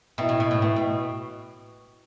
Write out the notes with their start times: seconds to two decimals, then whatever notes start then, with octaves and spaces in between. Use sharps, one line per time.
0.18 B2 E4 B4 E5 G5
0.29 A2
0.40 B2
0.51 A2
0.62 A2 E4 B4 E5 G5
0.76 B2